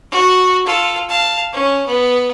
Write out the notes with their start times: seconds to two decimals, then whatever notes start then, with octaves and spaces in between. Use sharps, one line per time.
0.11 F#4
0.66 F4 A4
1.09 F5 A5
1.52 C#4
1.87 B3